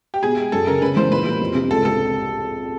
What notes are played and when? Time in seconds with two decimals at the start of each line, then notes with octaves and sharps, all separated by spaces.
0.14 G4
0.23 B2 G#4
0.38 G#3
0.52 F#2 A4
0.67 C#3 A#4
0.82 C#3 B4
0.97 E3 C5
1.11 A#2 B4
1.26 G3
1.41 F2
1.55 C3
1.70 C#2 A4
1.85 C3 A4